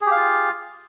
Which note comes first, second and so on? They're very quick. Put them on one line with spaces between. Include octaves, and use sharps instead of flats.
G#4 G4 F5 F4